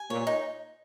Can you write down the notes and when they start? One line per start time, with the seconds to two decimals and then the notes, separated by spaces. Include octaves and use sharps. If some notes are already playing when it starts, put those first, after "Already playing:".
Already playing: G#5
0.10 A#2 C#5
0.27 D#4